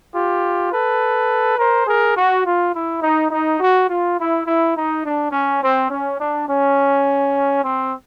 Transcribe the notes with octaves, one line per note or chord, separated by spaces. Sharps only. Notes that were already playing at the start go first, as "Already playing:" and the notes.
F4 G4
A4 B4
A#4 C5
G#4 A#4
F#4
F4
E4
D#4
D#4
F#4
F4
E4
E4
D#4
D4
C#4
C4
C#4
D4
C#4
C4